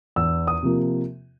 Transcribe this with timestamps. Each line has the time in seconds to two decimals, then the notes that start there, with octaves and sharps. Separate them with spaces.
0.16 E2 E6
0.47 D#6
0.63 C3 F3 A#3